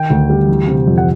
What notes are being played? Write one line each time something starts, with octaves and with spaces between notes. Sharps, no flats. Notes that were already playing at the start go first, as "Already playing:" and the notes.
Already playing: D#3 G5
D2
G3
E3
C3
F2
F#5